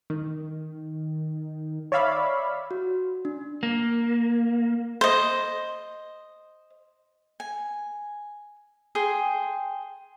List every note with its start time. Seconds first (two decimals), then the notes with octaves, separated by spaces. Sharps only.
0.10 D#3
1.92 C#5 D5 E5 F5 B5
2.71 F#4
3.25 D4
3.63 A#3
5.01 C5 D#5
7.40 G#5
8.95 G#4 G5 C6